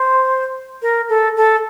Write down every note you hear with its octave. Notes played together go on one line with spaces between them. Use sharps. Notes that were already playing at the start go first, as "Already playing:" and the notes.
Already playing: C5
A#4
A4
A4